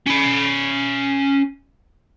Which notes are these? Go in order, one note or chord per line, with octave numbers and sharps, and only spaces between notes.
C#4 B5